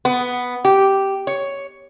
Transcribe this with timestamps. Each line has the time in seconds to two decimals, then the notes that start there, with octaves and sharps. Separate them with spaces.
0.05 B3
0.65 G4
1.27 C#5